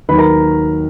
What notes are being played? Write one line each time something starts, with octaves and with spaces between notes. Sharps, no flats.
D#2 D#3 F#3 B4 B5
A#4 A#5